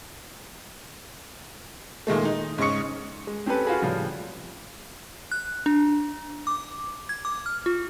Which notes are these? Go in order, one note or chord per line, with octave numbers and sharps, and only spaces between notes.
A#2 D#3 G#3 A3
D#4
G#2 C#3 D#5 C#6 C#7
G#3
C4 C#4 G4 A4 B4
F4 F#4 G#4 B5
A2 C#3 F3 G3
F#6
D4
D6
G#6
D6
F6
F4